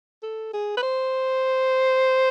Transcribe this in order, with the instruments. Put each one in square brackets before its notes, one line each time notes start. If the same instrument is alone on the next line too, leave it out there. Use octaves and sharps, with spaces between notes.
[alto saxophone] A4
G#4
B4
C5